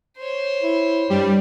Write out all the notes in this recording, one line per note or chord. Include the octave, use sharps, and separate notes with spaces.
C5 C#5
E4
G2 G3